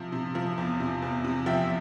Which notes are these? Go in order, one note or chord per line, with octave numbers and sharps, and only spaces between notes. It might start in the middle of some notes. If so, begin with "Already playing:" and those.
Already playing: C3 F3
C3
F3
E2
C3
E2
C3
F3 E5 G5